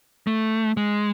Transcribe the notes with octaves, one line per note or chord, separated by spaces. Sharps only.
A3
G#3